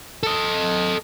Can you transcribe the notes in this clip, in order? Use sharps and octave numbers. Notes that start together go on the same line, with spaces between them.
A4 D#5